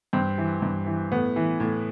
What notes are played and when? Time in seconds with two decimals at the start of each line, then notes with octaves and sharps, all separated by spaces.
0.13 G2 C4
0.38 E3
0.62 G2
0.86 E3
1.12 A2 B3
1.36 E3
1.60 A2